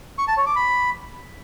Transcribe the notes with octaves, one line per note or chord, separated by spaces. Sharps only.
C#6
A5
C#5
D6
B5